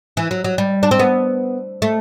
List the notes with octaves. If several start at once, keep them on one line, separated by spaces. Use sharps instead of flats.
E3
F#3
F#3
G3
D4
C4
B3
A3